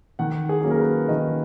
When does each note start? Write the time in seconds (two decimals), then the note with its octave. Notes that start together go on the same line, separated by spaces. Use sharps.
0.19 D#3 F#5
0.49 G#4
0.61 F#3 A#3 C#4 G#4
0.70 A#4
0.79 B4
1.08 D#3 D#5